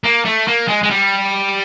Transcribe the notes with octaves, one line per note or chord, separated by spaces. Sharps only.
A#3
A3
A#3
G#3
G#3
G3